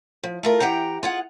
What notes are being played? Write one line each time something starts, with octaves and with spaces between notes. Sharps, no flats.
F3
A3 F4 A#4
E3 G4 F#5 G5 A#5
F4 G#4 F#5